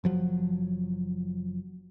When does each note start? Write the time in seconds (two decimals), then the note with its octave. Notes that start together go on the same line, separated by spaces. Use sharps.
0.04 F#1 F3 F#3